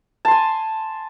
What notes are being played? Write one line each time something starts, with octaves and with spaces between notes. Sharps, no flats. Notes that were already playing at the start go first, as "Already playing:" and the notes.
G#5 A5 C6